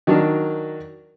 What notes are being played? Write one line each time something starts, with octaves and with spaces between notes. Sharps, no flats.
D#3 F#3 D4 A#4